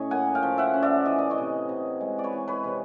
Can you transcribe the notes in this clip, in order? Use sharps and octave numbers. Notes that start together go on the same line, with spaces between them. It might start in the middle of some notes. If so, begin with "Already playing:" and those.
Already playing: A2 C#4 C#5 D#5
A#3 F#5 G#5
F5 G5
F3
E5 F#5
C#4
D5 E5
E3 D#5
D5
C#5 D#5
C3
C3
G#3
D5
B4 C#5
E3
B4 C#5
C3